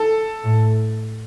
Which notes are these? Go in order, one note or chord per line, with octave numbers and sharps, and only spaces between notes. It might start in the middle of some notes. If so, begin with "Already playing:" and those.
Already playing: A4
A2